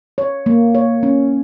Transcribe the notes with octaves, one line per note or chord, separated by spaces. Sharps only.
C#5
A#3
C#5
C#4